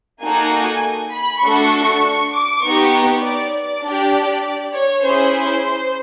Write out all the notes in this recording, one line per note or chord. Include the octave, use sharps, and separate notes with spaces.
A#3 D#4 F#4 A4 G#5
G#5
B5
A3 D4 F#4 A4 C#6
D6
B3 D#4 G4 C#6
D5
D5
D4 G4
C#5
C#4 E4 G#4 C5
C5